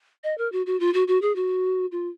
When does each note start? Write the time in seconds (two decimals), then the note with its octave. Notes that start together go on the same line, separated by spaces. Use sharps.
0.24 D#5
0.38 A#4
0.52 F#4
0.66 F#4
0.80 F4
0.94 F#4
1.08 F#4
1.22 G#4
1.36 F#4
1.92 F4